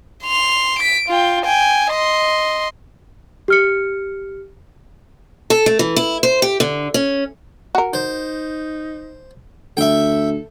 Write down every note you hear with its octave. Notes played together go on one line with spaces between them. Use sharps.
C6 F7
B6 D7
F4 G5
G5 G#5
D#5 C6
G4 F6 C#7
A4
A3
E3
E4
C5
G4
D3
C#4
F#4 A#4
D#4 C5
D2 A4 E5 G5